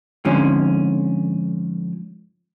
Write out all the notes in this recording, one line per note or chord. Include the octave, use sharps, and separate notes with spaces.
F2 G#2 D3 F3 C#4